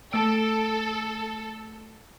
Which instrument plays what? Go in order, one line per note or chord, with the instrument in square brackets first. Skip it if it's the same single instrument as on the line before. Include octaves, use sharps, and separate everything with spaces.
[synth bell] A3 E6 D7 [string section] A4